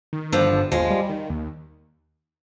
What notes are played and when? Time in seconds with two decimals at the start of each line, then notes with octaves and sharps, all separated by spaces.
0.13 D#3
0.32 G2 D3 F3
0.52 G1
0.71 D#2 F3 G#3
0.90 G3
1.10 D#3
1.29 D#2